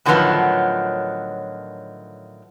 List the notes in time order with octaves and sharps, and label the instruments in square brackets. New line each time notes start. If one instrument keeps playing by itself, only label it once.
[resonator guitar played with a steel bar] A2 D3 D#3 F3 F#3 B3